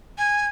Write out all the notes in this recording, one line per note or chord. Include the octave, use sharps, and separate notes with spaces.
G#5